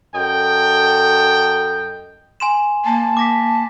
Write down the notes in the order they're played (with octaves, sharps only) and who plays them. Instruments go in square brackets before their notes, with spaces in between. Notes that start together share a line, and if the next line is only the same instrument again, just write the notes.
[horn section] F#2 A4 D#5 G5
[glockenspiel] G#5 C6 E7
[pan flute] A#3 [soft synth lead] A5
[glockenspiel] D6 A#6 B6